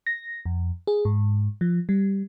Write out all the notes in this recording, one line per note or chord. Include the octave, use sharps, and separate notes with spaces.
A#6
F2
G#4
G#2
F3
G3